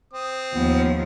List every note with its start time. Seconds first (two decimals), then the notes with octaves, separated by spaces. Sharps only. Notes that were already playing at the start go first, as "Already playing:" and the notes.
0.13 C4 D#6
0.54 D#2 F3 B3